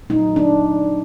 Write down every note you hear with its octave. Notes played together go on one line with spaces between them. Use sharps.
A#2 F#3 A3 D#4
D4